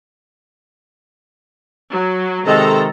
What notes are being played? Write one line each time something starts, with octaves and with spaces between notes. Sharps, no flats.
F#3
C3 D#3 G#3 A4 A#5